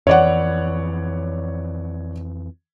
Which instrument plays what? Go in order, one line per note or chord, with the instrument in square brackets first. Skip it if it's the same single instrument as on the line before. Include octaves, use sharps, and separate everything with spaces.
[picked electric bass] F2 E3 [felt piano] C#5 D5 F#5